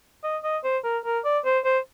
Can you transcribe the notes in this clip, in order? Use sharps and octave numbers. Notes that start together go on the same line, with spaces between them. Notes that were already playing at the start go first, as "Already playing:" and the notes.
D#5
D#5
C5
A#4
A#4
D5
C5
C5